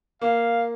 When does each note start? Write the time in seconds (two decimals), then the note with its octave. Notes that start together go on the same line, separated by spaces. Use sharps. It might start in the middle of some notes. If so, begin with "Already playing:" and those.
0.21 A#3 F5